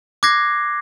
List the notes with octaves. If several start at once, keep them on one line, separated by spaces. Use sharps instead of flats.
D6 F#6 G#6 A#6 C7